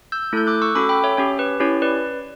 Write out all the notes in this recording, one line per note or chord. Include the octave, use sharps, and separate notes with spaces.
E6 G6
A3 E4 A4 G6
D6 F#6
C#6 E6
C#4 F#4 A4 B5 D6
G5 B5
C#5 E5
C#4 G4 C#5
B4
C#4 E4 G4 C#5
B4 D5